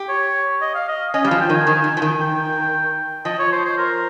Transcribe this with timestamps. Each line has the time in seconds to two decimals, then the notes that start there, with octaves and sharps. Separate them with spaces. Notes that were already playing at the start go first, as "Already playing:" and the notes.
Already playing: G4
0.08 C#5
0.61 D#5
0.74 F5
0.88 D#5
1.14 C#4 D#5
1.24 G3 F5
1.31 F3
1.40 G5
1.50 D#3 G#5
1.67 D#3
1.84 D#3
1.97 F3
2.02 D#3
2.20 G5
3.25 F3 D#5
3.39 C#5
3.52 C5
3.65 C5
3.78 A#4